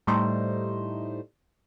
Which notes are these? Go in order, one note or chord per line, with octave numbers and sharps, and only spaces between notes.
A2 G3 A3 D#4 C5